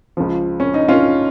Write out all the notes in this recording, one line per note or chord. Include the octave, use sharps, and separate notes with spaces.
C#2 C#3 F3
C#4
D#4
C#4 F4